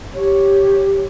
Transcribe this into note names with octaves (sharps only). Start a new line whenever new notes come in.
G4 C#5